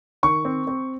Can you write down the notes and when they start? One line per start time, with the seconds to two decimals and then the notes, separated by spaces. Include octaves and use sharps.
0.23 D#3 C#6
0.45 C4
0.67 C4